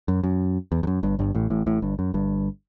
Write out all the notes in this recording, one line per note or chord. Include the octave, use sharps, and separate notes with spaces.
F#2
F#2
E2
E2
F#2
G1 G2
G1 G2
A1 A2
A1 A2
A1 A2
G1 G2
F#2
G1 G2